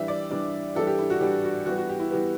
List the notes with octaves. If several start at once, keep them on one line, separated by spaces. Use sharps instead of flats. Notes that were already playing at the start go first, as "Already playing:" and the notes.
Already playing: E3 G3 D4 E5
D5
E3 G3 D4
E3 G3 D4 A4
G4
E4
F#4
E3 G3 D4 G4
F#4
E3 G3 B3 F#4
F#4
G4
E4
E3 G3 B3 G4